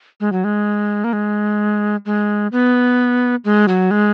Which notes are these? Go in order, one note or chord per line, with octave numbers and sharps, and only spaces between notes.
G#3
F#3
G#3
A#3
G#3
G#3
B3
G#3
F#3
G#3